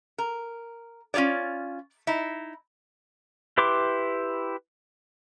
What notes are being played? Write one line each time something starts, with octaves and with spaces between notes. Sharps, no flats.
A#4
C#4 F4 G#4 C#5 D5
D#4 E4
E4 G4 B4 C6 D6